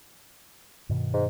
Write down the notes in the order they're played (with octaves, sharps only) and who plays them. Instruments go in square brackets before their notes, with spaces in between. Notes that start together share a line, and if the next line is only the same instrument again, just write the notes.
[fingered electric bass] G2 B2 D#3
[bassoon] G#2